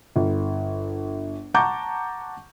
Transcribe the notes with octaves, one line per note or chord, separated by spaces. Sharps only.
G1
F#5 A5 A#5 C#6 D6 G6